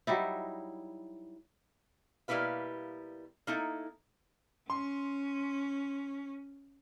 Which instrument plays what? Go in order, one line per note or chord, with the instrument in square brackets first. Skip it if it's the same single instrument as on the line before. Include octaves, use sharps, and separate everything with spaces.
[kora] F#3 G3 D#4 E4
[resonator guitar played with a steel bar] B2 G3 A#3 E4 B4 F5
A#3 D#4 E4 A4
[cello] C#4 [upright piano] C6